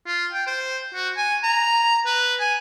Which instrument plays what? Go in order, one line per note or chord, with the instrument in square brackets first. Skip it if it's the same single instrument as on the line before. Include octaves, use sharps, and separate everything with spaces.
[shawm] F4
G5
C5
F#4
G#5
A#5
B4
G#5